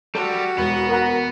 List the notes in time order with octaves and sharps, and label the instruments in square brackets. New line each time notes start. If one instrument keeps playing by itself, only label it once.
[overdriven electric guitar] G3 [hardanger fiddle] F#4 [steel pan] A4
[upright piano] E1 [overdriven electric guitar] B3
[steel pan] A#4 F#5 A#5